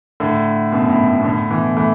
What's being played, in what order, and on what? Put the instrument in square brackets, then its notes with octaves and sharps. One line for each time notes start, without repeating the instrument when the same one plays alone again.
[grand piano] A2 D3
F#2 B2
A2
A2
B2
A2 D3
B2 E3
E3 A3